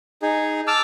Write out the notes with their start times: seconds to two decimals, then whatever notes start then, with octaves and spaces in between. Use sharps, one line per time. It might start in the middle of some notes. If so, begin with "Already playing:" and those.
0.22 D#4 G#4
0.67 A5 D6 E6 F6